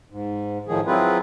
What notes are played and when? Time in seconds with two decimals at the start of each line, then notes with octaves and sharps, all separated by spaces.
0.10 G#2
0.67 A2 D#3 F3 G#4
0.87 F#3 C4 E4 F4 G#4 B4